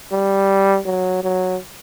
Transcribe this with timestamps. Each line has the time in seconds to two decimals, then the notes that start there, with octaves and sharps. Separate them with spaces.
0.12 G3
0.86 F#3
1.23 F#3